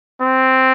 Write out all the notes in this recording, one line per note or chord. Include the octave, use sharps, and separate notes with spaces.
C4